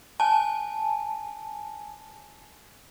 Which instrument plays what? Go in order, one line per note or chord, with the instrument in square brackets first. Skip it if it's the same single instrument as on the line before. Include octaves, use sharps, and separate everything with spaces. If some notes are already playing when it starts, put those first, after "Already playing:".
[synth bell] G#5 A5